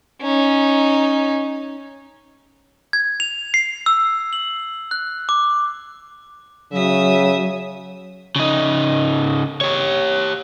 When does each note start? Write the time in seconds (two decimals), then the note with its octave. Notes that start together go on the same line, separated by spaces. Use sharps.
0.22 C#4 D#4
2.93 G#6
3.20 F7
3.54 C7
3.86 E6
4.33 F#7
4.91 F#6
5.29 D6
6.72 C#3 F#3 E5 D#6
8.36 C#3 D#4
9.61 G4 C#5